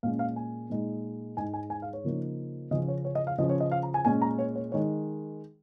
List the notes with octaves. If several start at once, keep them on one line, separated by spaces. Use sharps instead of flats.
A#2 G#3 C#4 F5
F5
G#5
A#2 G#3 D#4
G#2 G#3 D#4 G#5
G#5
G#5
F5
C#5
C#3 F3 A#3 D#4
C#3 F3 C#4 D#5
C#5
C#5
D#5
F5
C#3 F3 C#4 D#5
C#5
D#5
F5
A#5
G#5
A#2 G#3 C#4 G#5
A#5
C#5
C#5
D#3 G#3 C#5